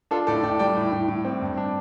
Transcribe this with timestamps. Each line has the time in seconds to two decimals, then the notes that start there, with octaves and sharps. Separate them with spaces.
0.11 D4 F4 A4
0.27 A2 A4 D5
0.43 A2 D5 G5
0.59 G3 D5 G5
0.77 A2
0.92 A2
1.08 A2
1.25 C4
1.42 G2
1.57 D4